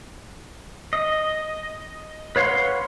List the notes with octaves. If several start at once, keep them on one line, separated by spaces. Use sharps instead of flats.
D#5
B4 C#5 F5 F#5 C6